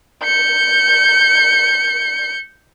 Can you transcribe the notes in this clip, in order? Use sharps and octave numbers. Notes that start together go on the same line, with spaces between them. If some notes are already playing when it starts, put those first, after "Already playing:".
G6 C#7